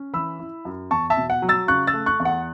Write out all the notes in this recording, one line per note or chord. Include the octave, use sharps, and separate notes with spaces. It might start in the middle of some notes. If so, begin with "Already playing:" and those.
Already playing: C#4
E3 B5 E6
E4
F#2
E2 A5 C#6
E5 A5
B2
F#5
F#3
E6 A6
C#3 C#6 F#6
E6 A6
A3
C#6 F#6
E2
F#5